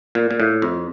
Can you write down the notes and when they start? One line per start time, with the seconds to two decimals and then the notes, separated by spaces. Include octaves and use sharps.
0.15 A#2
0.31 A#2
0.40 A2
0.62 F2